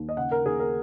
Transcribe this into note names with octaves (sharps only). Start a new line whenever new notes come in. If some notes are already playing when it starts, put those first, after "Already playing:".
Already playing: D#2
D#5
C#3 F#5
A#4
D#2 G#4
A#4